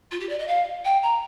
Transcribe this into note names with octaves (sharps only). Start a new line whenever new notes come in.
F4
G4
D5
D#5
F5
G5
A#5